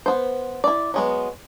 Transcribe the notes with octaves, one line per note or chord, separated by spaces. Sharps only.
B3 C5
E4 D5
F#3 G#3 B3